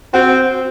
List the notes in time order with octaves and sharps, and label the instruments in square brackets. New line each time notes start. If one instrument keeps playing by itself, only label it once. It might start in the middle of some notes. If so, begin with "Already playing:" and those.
[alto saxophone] C4 [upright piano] F#4